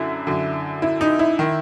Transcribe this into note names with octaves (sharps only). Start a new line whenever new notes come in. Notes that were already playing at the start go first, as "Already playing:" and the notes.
Already playing: F#2 D3 E4
F#2 D3
E4
D#4
E4
D#3